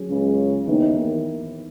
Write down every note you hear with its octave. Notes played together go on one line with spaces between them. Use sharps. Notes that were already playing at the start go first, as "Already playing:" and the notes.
Already playing: F#3 C#4 G#4
C#2 C#3
D#2 D#3 E3 B3 D#4
D#2 D#3